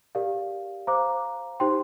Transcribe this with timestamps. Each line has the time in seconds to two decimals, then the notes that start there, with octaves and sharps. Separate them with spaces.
0.15 G4 A#4 D5 F5
0.87 C5 F5 A#5 D6
1.60 D#4 G4 C5 G5 C6